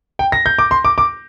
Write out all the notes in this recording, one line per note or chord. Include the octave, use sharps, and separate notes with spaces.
G5
A#6
G6
D6
C6
D6
D6